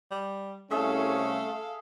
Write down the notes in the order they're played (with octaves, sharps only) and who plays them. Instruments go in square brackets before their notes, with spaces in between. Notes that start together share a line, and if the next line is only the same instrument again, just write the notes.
[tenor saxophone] G3
[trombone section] C2 C#4 [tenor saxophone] A3 [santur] G#4 E5 [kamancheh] A4 F5